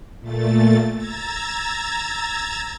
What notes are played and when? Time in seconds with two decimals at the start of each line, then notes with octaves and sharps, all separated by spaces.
0.20 A#2 A3 A6
0.96 A#5 E6 G#6 A6